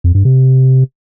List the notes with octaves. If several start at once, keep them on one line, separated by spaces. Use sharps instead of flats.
F2
G2
C3